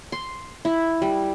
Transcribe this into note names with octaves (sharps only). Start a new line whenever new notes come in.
C6
E4
G3